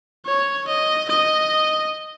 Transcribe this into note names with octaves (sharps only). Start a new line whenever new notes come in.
C#5
D#5
D#5